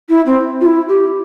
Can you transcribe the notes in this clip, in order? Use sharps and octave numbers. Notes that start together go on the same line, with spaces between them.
E4
C4
F4
E4
G4